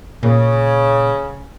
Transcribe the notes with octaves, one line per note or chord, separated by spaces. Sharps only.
A#2 C#3